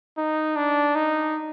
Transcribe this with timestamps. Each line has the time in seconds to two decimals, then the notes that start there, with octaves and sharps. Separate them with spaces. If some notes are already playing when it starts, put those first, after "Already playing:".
0.18 D#4
0.56 D4
0.95 D#4